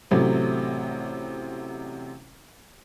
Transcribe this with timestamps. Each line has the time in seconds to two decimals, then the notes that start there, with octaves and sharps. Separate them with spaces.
0.11 A1 C3 F#3 A3